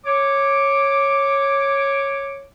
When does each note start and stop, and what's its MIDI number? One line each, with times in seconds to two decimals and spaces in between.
0.06 2.44 73
0.06 2.44 86